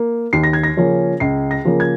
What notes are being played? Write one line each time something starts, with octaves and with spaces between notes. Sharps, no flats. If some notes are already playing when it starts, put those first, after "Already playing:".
Already playing: A#3
D#2 C7
A#6
G#6
A#6
C#3 F3 A#3 C#4
C#2 C7
A#6
C#3 F3 A#3 C#4
G#6